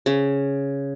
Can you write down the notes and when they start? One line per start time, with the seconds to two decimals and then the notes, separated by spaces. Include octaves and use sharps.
0.06 C#3